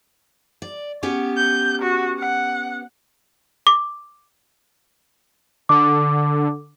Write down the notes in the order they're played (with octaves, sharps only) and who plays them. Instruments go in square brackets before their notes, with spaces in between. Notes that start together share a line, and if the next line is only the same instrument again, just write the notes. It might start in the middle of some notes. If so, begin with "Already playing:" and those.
[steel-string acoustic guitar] D5
B3 C#4 G4
[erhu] G6
F#4
F#5
[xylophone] D6
[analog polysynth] D3 [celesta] D6